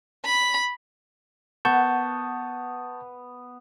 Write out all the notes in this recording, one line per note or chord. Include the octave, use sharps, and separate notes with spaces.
B5
B3 A5 C#6 G6